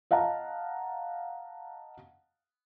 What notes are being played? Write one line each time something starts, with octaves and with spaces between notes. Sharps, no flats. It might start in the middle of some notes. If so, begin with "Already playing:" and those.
D#5 F5 F#5 A5 A#5